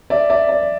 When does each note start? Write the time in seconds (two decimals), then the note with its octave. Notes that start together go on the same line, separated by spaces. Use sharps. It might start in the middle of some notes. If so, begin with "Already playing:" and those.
0.10 D5 E5
0.29 D5 E5
0.49 D5